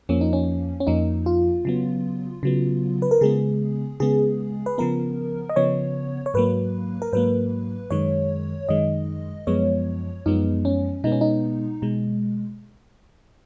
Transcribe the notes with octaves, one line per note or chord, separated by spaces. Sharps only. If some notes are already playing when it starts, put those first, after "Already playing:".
F2 F3 A#3 C#4
D#4
C#4
C#4
F2 F3 A#3 D#4
F4
C#3 F#3 B3
C#3 F#3 B3
B4
A#4
C#3 G#3 B3 G#4
C#3 G#3 B3 G#4
B4
C#3 F3 B3 A#4
D#5
C#3 F3 B3 C#5
C#5
G#2 F#3 A#3 B4
A#4
G#2 F#3 A#3 B4
F#2 D#3 G#3 C#5
F#2 D#3 G#3 D#5
F#2 F3 G#3 B3 C#5
F#2 F3 G#3 B3 D#4
C#4
B2 G#3 B3 D#4
C#4
D#4
B2 G#3